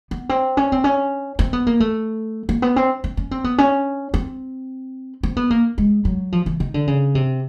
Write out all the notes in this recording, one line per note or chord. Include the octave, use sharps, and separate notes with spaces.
B3
C4
C#4
C4
C#4
C4
B3
A#3
A3
A#3
B3
C4
C4
C#4
C4
B3
C#4
C4
C4
B3
A#3
G#3
F#3
F3
E3
D#3
D3
C#3
C3